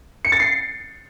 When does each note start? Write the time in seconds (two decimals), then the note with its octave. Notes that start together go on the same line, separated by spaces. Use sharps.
0.25 C#7
0.32 A6
0.40 C7